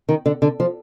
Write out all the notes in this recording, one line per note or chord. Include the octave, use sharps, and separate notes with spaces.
D#3
D3
D3
F3